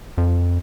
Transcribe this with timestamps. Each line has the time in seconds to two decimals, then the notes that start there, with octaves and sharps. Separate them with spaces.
0.18 F2